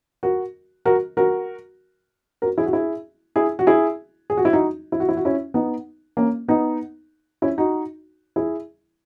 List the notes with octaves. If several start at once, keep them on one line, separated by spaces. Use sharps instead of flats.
F#4 A#4
F#4 A#4
F#4 A#4
F#4 A#4
E4 G#4
F#4
E4 G#4
E4 G#4
F#4
E4 G#4
G#4
F#4
E4
D#4 F#4
E4
F#4
E4
F#4
C#4 E4
B3 D#4
A#3 C#4
B3 D#4
C#4 E4
D#4 F#4
E4 G#4